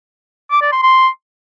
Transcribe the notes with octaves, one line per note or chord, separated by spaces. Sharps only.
D6
D5
C6
C6